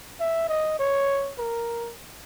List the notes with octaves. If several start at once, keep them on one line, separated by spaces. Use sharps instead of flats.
E5
D#5
C#5
A#4